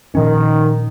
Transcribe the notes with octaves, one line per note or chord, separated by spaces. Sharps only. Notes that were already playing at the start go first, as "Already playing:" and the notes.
A#2 D#3 F3 C#4